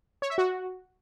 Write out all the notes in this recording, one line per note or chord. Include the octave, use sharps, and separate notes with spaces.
C#5
E5
F#4